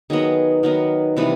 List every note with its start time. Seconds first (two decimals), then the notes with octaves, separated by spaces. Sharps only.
0.10 D#3 F#3 B3 G#4
0.63 D#3 F#3 B3
1.17 C3 E3 G3 B3 B4